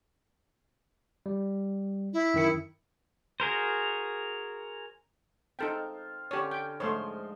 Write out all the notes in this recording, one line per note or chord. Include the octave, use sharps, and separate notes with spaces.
G3
E4
F#2 D#3 C#7
F#4 G#4 A#4 C5
C4 D#4 F4 A4 G5
D3 C#4 F4 G4 C#5
G5
G#2 F3 A3 C5 C#5 C6